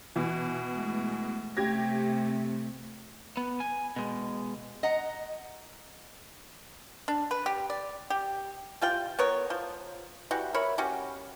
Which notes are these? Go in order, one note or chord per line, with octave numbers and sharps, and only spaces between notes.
B2 E3
G#3 A3
C3 A3 G4 G#6 A#6
B3
G#5
B2 G#3
D#5 F#5 A#5
D4
B4
G4
D5
G4
G3 F4 G5
B3 A#4 C#5
F3
E3 G3 F#4
A#4 C#5 E5 B5
C#4 F#4 G4